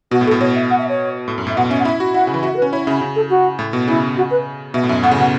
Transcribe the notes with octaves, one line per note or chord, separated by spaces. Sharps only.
B2 F#4
A2
B2 A4
A2
B2 C#5
E5
F#5
E5
C#5
A2
F#2
A2 E5
B2 F#5
C#4 E5
F#5
E4 E5
F#4
E4 F#5
C#3
E3
F#4 E5
A4
B4
C#4
E4 C#5
C#3 E5
C#3
A4
F#4
A2
B2
C#3 E4
F#4
B4
B2 E5
A2
F#2 E5
A2 F#5
C#3
B2 F#5